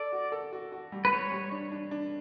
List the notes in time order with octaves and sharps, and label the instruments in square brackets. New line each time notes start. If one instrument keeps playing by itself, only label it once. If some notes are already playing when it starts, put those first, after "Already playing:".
Already playing: [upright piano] A4 [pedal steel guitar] D5
[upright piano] F#4
A4
F#4
F#4
G3
[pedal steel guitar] B4
[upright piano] G3 [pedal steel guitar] C#5
[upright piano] G3
D4
D4
D4